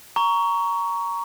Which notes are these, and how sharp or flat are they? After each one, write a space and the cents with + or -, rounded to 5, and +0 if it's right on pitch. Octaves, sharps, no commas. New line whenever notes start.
A#5 +0 C#6 +15